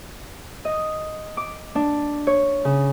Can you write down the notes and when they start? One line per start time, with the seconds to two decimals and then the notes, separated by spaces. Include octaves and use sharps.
0.65 D#5
1.37 D6
1.75 D4
2.27 C#5
2.65 C#3